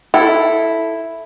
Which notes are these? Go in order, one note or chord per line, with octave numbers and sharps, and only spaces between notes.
E4 A4